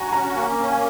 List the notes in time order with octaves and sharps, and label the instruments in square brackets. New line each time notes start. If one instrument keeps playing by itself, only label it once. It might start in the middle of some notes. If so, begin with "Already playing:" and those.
Already playing: [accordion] F#4 [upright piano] G#5 A#5
[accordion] C#4 [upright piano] A#5
[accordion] A#3
C#4
[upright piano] G#5